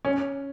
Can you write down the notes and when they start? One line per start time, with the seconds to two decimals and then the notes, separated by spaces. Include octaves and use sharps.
0.05 C#4